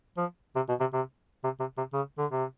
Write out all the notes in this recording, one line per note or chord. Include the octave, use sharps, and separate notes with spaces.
F3
C3
B2
C3
C3
C3
C3
C3
C#3
D3
C3